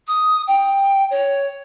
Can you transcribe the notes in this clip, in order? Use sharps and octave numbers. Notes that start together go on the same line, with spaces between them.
D#6
G5
C#5